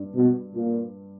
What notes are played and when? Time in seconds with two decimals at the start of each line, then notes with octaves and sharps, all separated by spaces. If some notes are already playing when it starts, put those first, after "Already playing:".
Already playing: G2
0.15 B2
0.55 A#2